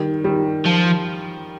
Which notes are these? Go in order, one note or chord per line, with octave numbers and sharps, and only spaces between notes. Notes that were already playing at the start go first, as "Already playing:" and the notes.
Already playing: D#3 G3
D#3 G3
F3